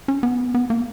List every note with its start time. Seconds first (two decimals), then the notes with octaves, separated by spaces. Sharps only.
0.08 C#4
0.23 B3
0.55 B3
0.70 A#3